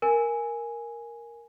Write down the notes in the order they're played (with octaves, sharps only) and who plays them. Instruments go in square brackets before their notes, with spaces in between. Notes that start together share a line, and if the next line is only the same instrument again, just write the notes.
[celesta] A#4 G#5